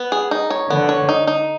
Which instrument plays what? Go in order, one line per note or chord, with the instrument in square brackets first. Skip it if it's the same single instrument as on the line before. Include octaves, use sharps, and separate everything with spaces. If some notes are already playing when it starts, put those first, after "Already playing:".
Already playing: [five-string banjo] B3
G#4
D#4
C#5
[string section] D3 [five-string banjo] B3
[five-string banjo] C#5
D#4
D#4